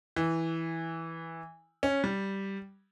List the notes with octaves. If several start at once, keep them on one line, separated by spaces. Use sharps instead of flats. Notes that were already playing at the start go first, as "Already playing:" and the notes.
E3
C#4
G3